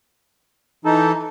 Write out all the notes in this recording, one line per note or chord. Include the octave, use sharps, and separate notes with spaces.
E3 D#4 A4